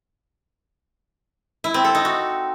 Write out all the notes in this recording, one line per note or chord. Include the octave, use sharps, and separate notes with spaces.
E4
C4
A4
D#4
F#4